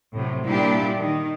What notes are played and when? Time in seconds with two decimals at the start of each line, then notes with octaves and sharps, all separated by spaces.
0.14 A2 C3 F#3
0.44 A#2 G3 A#3 D4 E4 G4
0.99 D#3